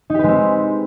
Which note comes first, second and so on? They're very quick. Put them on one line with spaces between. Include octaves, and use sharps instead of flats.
D#4 G4 B4 G#3 C4